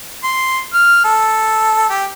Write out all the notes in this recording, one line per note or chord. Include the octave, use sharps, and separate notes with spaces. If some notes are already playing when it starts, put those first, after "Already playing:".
C6
F6
A4
G4